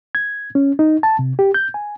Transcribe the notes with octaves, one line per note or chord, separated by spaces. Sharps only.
G#6
C#4
D#4
A5
C3
G4
G6
G#5